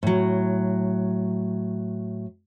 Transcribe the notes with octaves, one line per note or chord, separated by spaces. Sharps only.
A2 F#3